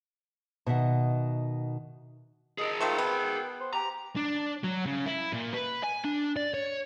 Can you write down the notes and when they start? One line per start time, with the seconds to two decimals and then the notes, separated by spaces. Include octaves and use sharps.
0.66 B2 D#3 E5 F#5
2.58 G#4 A#4 D#5
2.80 D#3 A3 F4 C5
2.98 B3 G5
3.61 C5
3.74 G4 A#5
4.16 D4
4.63 F#3
4.86 C#3
5.06 E4
5.33 A#2
5.54 B4
5.84 G#5
6.05 D4
6.37 D5
6.54 C#5